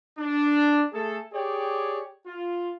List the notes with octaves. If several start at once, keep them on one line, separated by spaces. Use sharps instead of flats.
D4
A3 G#4 A4
G4 G#4 C#5 D5 G5
F4